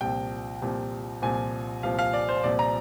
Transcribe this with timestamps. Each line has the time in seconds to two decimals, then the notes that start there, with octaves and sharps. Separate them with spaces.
0.01 C2 A#2 F3 G5
0.62 C2 A#2 F3
1.22 C2 A#2 F3 G#5
1.83 C2 A#2 F3 F5
1.99 F5
2.13 D5
2.29 C5
2.44 C2 A#2 F3 D5
2.59 A#5